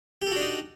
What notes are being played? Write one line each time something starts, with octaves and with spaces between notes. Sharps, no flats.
D4 D#4 F#4 G4 A4